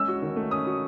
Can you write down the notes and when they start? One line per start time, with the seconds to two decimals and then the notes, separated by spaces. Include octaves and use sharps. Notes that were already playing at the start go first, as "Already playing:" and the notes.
Already playing: G#3 C#4 E6
0.08 F#4
0.22 D#3
0.36 A3
0.51 C#4 D#6
0.67 F#4